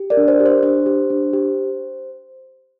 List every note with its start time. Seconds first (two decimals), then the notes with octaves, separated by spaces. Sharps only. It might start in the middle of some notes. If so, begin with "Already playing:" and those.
Already playing: G4
0.10 A#4 D5
0.17 D4
0.28 C5
0.40 G4
0.46 C5
0.63 D4 C5
0.86 G4
1.10 D4
1.33 G4